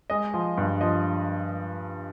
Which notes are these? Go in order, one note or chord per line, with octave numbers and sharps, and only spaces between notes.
G#3 D#5
F3
G2
F3 D#5